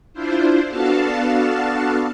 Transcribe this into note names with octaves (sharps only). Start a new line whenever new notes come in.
D4 E4 F4 C5
B3 D4 F#4 A4 F5 A5